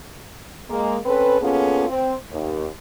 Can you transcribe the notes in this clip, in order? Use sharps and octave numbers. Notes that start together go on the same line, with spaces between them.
G#3 A#3
C4 C#4 A4 B4
A#3 B3 C#4 F4 G#4 A4
C4
D#2